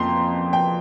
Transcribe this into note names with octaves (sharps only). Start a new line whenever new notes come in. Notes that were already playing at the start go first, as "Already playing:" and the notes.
Already playing: F2 F3 A#3 G5 A#5 C6
G5